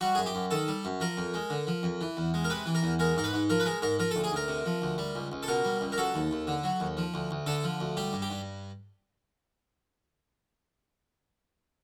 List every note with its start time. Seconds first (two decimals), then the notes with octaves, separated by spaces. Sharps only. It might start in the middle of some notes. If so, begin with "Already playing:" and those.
0.01 G3 F#4
0.15 F#2 G#4
0.26 G4
0.35 F#2
0.51 D#3 A4
0.68 G3
0.85 F#2
1.00 F3 A#4
1.17 F2
1.34 G#3
1.50 D3
1.67 F3
1.83 F2
2.01 E3
2.17 E2
2.34 G#3
2.45 A#4
2.50 C3 B4
2.66 E3
2.75 A#4
2.83 E2
2.99 G#3 A#4
3.17 G#2 A#4
3.24 B4
3.33 G#2
3.50 F3 A#4
3.60 B4
3.66 G#3 A#4
3.82 G#2 A#4
3.99 F3 A#4
4.11 A4
4.16 D2
4.24 G#4
4.32 D2 A#4
4.48 C3
4.66 F3
4.82 D2
4.98 G3
5.15 C#2
5.32 C#2
5.43 A4
5.48 B2 A#4
5.65 G3
5.81 C#2
5.92 A#4
5.97 F#3 A4
6.14 D#2
6.31 D#2
6.47 D3
6.64 F#3
6.80 D#2
6.97 F3
7.14 D2
7.31 D2
7.46 D3 A4
7.64 F3
7.80 D2
7.97 G3 G4
8.13 G2
8.22 G4
8.30 G2